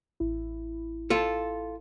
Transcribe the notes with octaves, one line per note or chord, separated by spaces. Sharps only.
A1 E4
F4 A4